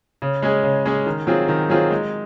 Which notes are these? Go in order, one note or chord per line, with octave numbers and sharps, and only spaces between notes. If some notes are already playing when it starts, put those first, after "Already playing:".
C#3
G#3 C#4 G#4
C#3
G#3 C#4 G#4
D#3
F#3 C4 F4 G#4
D#3
F#3 C4 F4 G#4
G#3